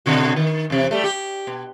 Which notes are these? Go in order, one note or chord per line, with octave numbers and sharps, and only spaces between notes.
B2 D3 F#4
D#3
E2 C3
G3 A3
G4
B2